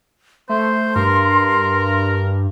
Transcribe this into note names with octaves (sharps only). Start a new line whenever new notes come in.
A3 C5 C6
G2 A#4